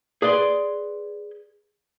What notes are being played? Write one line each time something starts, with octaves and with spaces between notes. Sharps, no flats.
G#4 B4 D5 C6